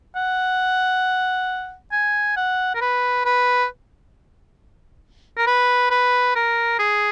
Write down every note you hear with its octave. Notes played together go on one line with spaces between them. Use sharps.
F#5
G#5
F#5
A#4
B4
B4
A#4
B4
B4
A#4
G#4